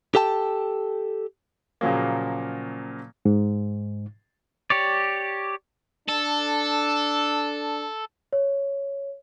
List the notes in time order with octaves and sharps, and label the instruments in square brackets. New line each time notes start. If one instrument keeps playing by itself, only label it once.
[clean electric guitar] G4 A4 G5 A5
[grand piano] A#2 C#3 F3 F#3 A#3
[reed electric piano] G#2
[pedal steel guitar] G4 C#5 D5
[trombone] D4 [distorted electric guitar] A4
[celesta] C#5